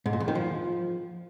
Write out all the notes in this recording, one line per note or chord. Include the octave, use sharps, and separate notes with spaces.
G#2
A#2
E2
D#3
F3